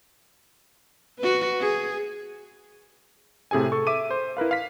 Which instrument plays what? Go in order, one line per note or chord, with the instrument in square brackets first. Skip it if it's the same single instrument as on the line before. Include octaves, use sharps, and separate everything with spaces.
[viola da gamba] F#4 B4
G#4
[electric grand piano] A2 C3 G#4 A4 G#5
A4 C#6
E5 D6 D#7
C5
E4 A#4 B4 F5
F5 B6